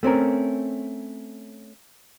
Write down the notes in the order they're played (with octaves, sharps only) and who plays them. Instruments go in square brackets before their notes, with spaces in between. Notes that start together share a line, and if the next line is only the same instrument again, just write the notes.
[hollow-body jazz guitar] A3 C4 C#4 A#4